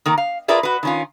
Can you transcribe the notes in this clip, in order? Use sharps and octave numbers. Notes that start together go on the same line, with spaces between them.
D#3 A#3 A#4
F5
F4 G#4 A#4 B4 D5 E5
F#4 B4
D#3 C#4 F4